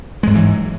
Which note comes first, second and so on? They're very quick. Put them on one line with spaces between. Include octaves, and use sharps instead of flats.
G#3 G#2 F#3 E3